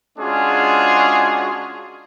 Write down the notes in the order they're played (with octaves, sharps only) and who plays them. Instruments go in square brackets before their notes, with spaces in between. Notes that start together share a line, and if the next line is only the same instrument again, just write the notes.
[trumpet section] G#3 C#4 D4 F4 F#4 G#4